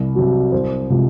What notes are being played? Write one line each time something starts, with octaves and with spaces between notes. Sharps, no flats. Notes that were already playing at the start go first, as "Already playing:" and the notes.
Already playing: C2
C3 F#3
C2 C5
C3 F3 G#3